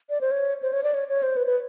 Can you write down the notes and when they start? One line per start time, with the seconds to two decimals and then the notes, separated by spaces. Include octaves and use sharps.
0.10 D5
0.21 C5
0.31 C#5
0.63 C5
0.73 C#5
0.83 D5
0.94 C#5
1.09 C#5
1.23 C5
1.36 B4
1.47 B4